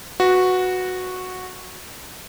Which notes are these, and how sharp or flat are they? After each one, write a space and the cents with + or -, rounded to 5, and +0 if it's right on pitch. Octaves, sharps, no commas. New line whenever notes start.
F#4 -10 B4 +0